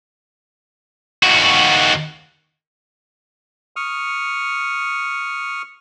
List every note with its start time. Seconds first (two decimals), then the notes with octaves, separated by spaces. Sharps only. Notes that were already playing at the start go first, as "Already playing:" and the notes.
1.23 D#2 F#4
3.76 C#6 D#6 F6